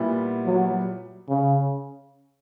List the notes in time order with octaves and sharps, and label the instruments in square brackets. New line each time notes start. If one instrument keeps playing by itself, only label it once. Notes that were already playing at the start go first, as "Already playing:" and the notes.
Already playing: [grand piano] A#2 G3 B3 E4
[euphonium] F#3
C#3